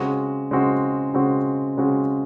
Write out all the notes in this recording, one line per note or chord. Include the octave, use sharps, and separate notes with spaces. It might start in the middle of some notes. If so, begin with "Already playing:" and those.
Already playing: C#3 G#3 C4 F#4
C#3 G#3 C4 F#4
C#3 G#3 C4 F#4
C#3 G#3 C4 F#4